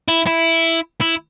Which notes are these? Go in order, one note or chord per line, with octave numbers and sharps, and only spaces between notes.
E4
E4
E4